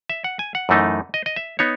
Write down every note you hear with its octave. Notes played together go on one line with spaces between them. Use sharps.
E5
F#5
G#5
F#5
F#2 E3 A3 D#4
D#5
D#5
E5
B3 D#4 C#5